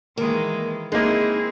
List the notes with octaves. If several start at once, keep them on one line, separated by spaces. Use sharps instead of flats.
D#3 E3 G#3 A#3
G#3 A#3 C4 D#4 E4 G#4